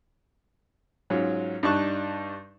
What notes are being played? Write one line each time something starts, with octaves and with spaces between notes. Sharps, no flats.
G#2 F#3 C#4 F4
G2 D4 D#4 A5 C#6 F#6